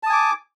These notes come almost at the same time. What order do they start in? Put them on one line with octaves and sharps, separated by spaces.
A5 D#6 G#5 D6